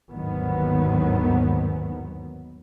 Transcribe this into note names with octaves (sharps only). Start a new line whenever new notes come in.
G1 D#2 G#2 D#3 F#3 B3